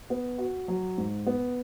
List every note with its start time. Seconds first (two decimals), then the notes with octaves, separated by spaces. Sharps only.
0.10 B3
0.38 F#4
0.68 F#3
0.98 G#2
1.27 B3